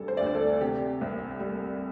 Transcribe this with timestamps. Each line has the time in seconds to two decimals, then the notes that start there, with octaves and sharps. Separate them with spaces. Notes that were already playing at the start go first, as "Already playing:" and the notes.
Already playing: D2 C3 G3 A4
0.08 C5
0.17 D2 D5
0.26 C5
0.35 A4
0.60 C3 G4
1.01 C2
1.40 G3